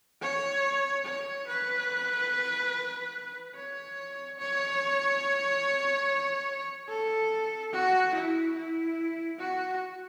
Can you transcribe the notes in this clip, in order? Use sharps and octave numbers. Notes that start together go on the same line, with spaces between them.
C#5
C#5
B4
C#5
C#5
A4
F#4
E4
E4
F#4